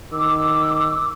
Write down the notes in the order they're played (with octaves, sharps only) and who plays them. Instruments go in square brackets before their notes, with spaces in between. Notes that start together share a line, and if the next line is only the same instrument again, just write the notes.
[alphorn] D#3 [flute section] D6 E6